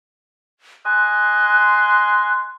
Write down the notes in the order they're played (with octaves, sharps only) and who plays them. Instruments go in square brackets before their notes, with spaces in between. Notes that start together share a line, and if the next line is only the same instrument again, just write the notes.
[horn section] D#5 G#5 C6 [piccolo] F#6